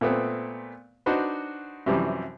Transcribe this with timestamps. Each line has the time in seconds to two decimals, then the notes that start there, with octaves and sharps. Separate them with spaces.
0.01 A#2 A3 B3 C4
1.06 D4 D#4 F#4 B4 C5
1.86 F#2 C3 E3 F3 G3